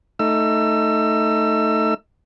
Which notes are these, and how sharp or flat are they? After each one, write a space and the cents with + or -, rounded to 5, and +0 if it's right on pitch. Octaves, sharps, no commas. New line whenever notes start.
A3 +0 D#4 +0 E6 +30